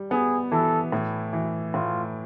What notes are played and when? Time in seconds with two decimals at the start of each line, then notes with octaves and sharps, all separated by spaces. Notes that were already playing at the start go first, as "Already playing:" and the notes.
Already playing: G3
0.11 B3 G#4
0.52 E3 A4
0.92 A2
1.33 E3
1.74 A2 F4